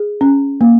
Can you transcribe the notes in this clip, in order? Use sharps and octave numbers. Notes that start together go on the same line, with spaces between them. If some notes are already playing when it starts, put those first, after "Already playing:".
Already playing: G#4
C#4
A#3